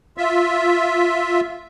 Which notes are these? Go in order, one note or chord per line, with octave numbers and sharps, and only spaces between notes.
F4 E5